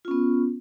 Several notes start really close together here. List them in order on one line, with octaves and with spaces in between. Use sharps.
F4 C#4 B3